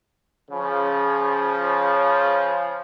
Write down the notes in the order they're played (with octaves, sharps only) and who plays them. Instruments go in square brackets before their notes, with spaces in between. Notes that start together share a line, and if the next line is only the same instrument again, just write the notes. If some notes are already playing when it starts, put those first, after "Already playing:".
[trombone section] C#3 F3